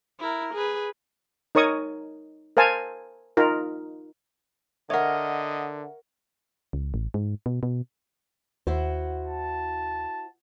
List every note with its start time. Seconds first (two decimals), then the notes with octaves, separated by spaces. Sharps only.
0.19 E4 A#4
0.54 G#4 B4
1.55 D#4 A#4 C#5 C#6 D#6
2.57 A#4 C5 F5 G#5 A5
3.37 D#4 F4 A#4
4.90 D3 A#4 C#5 D#5 E5 F#5
6.73 C#2
6.94 A1
7.14 G#2
7.46 B2
7.63 B2
8.67 D#2 E4 F#4 C5
9.27 A5